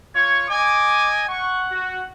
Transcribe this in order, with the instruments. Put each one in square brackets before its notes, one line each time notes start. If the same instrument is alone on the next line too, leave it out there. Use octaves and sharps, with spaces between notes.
[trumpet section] F4 C#5 C#6 [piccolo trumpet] G#6
[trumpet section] D#5 G#5 [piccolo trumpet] D6
[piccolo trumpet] F#5 [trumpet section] C#6
[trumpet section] F#4